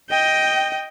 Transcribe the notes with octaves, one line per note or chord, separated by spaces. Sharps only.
D#5 G5